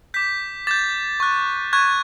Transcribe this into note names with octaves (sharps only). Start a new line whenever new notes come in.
D6 G6 B6
D6 G6 A6
C#6 F#6
C#6 F#6 G#6